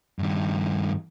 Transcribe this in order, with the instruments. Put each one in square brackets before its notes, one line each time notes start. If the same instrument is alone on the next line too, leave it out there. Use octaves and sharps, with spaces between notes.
[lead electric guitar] G2 D#3